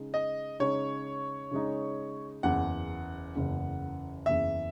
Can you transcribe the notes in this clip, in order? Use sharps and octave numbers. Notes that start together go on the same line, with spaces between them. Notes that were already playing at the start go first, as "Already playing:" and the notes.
Already playing: C#3 G#3 D#4
D#5
C#3 G#3 D#4 C#5
C#3 G#3 D#4
F#1 E2 C#3 F#5
F#1 E2 C#3
F#1 E2 C#3 E5